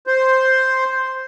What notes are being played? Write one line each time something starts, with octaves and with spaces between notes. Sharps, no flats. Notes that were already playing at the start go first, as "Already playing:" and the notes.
C5